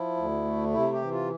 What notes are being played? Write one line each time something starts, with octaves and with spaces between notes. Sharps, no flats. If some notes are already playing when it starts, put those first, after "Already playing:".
Already playing: F3 E4
D2
A3
C3 E4
G4
E3
F4